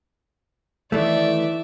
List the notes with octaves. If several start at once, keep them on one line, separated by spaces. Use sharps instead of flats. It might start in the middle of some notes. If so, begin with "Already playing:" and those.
D#3 E3 A3 D5 E5